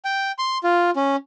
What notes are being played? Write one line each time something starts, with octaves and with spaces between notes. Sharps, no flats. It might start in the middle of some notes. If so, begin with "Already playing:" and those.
G5
C6
F4
C#4